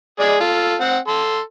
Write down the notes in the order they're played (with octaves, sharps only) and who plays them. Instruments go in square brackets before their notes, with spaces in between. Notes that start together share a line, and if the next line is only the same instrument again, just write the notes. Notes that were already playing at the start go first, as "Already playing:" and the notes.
[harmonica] G#3 G#4 D5
F4 A4
C4 F#5
A4 C6